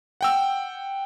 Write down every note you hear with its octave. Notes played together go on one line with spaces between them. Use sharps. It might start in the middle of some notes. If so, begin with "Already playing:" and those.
F#5 G5 E6